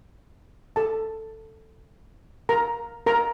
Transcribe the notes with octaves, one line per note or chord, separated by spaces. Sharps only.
A4 A5
A#4 A#5
A#4 A#5